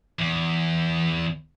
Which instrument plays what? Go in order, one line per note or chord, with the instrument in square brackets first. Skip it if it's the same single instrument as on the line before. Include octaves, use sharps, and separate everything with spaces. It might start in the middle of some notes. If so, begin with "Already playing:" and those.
[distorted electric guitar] E2